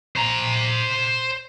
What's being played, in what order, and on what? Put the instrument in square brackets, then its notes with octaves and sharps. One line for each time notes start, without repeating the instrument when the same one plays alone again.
[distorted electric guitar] C5 A#5